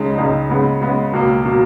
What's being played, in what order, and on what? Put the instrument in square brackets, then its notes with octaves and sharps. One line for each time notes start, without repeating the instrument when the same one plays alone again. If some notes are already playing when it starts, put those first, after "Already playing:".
Already playing: [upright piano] C#2 C#3 G#3 D#4
C#2 C#3 G#3 D#4
C#3 G#3 B3
C#3 G#3 B3
C#2 B2 A#3
B2 A#3